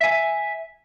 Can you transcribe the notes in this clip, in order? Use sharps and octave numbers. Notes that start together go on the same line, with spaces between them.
E5 G#5